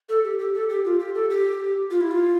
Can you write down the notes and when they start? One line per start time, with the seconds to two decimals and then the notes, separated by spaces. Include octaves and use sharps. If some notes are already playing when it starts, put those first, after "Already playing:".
0.09 A4
0.25 G4
0.39 G4
0.54 A4
0.69 G4
0.85 F4
1.00 G4
1.15 A4
1.30 G4
1.91 F4
2.01 E4
2.11 F4